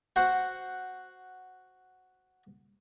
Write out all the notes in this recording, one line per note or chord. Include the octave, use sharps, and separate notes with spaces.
F#4 C5 F#5